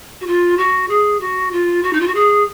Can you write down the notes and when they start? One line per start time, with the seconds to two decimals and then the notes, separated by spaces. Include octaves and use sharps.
0.21 F#4
0.27 F4
0.58 F#4
0.89 G#4
1.21 F#4
1.52 F4
1.83 F#4
1.93 D#4
2.00 F4
2.07 F#4
2.15 G#4